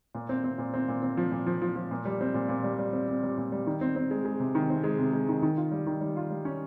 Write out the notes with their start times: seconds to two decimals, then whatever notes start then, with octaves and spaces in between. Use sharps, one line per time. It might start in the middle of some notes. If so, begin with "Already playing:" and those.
0.15 A#2
0.29 C4
0.44 C4
0.58 A#2
0.74 C4
0.88 A#2
1.03 C4
1.17 F3
1.32 A#2
1.46 F3
1.62 F3
1.76 F3
1.91 A#2
2.05 G3
2.21 C4
2.34 A#2
2.49 A#2
2.64 G3
2.79 G3
2.93 C4
3.08 C4
3.23 G3
3.38 A#2
3.52 G3
3.67 D#3
3.81 C4
3.96 C4
4.11 G#3
4.25 G#3
4.40 C3
4.55 D#3
4.70 C4
4.84 G#3
4.99 C3
5.13 G#3
5.28 D#3
5.43 D#3
5.57 F4
5.71 G3
5.87 D#3
6.01 G3
6.17 F4
6.30 G3
6.45 C#4